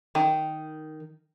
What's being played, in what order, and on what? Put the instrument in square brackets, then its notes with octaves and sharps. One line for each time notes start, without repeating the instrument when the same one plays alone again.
[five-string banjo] D#3